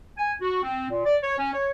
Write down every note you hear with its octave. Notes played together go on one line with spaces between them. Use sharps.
G#5
F#4
C4
A#2
D5
C#5
C#4
C#5